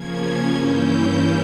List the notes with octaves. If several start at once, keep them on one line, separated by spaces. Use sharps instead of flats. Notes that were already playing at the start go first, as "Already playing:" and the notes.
Already playing: C#3 F3 A#3 C#4 G#6
G2 E3 A#3 C#4 E4 G6